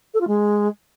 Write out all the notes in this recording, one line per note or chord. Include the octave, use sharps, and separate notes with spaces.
A4
F4
G#3